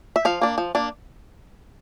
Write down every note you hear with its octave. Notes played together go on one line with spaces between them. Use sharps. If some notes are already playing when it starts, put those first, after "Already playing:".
E5
F3 F5
A#3 D4
F3
A#3 D4